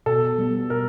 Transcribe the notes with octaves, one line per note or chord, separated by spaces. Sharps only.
B2 A4
G3 B3
B2 A#4